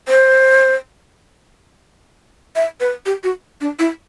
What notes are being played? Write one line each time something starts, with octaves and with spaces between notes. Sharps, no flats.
C5
E5
B4
G4
F#4
D4
E4